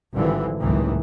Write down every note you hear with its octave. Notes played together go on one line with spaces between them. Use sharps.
G#1 G2 D3 E3 F3
F#1 C#2 A2 D#3 E3